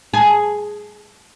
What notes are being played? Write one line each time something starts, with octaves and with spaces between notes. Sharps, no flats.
G#4